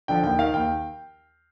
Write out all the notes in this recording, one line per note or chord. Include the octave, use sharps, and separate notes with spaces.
D3 F3 G5
D#2 G5
D#3 F5
D#2 G5